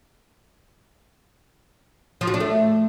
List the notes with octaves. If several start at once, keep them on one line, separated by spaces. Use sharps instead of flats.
F3
F#4
D4
A3